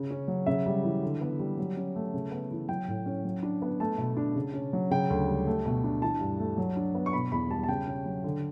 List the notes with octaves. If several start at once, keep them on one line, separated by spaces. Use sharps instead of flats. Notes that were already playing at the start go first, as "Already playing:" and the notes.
Already playing: C#3
C#4
F#3
C#3 E5
G3
E3
D3
B3
G3
F#3
C#4
A3
C#3
B3
E3
F#3 G5
A2
C#4
F#3
D4
B3
A3 A5
B2
D4
C#3
C#4
F#3
C#3 G5
D2
G3
A3
B2
D4
E3 A5
G2
A3
F#3
D4
B3
C#6
B2 B5
E2 B5
G3 A5
A5
C#3 G5
C#4
F#3
D3